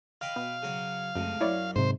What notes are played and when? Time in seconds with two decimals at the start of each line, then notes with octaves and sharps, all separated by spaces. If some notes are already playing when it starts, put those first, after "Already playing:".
0.21 D#5 F5 G5 B5
0.36 B2
0.62 C#3 F#3 C#5
1.15 C#2 F#2 A2 C3
1.41 F#2 E4 C#5 D5
1.76 G#2 C3 C5